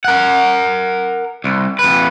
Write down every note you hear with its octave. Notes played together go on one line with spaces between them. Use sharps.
A#4 F#5
C2
F2 B4